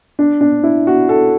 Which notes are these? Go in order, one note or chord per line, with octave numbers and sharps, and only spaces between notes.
D4
D4
E4
F#4
A4